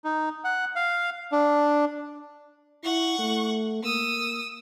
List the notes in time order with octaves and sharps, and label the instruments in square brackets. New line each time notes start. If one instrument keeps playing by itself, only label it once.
[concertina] D#4
F#5
F5
D4
[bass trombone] E4 [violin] F#5 C#6
[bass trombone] A3
[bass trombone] A#3 [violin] D#6 E6